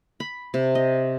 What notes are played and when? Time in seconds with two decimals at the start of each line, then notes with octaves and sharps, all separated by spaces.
0.20 B5
0.54 C3
0.75 D#5